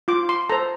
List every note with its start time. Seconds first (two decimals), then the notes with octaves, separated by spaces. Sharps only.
0.08 F4 D6
0.29 C6
0.49 A4 C5 A#5